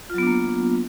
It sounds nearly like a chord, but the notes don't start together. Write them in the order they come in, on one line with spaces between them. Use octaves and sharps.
F4 F#3 B3 D4 A#3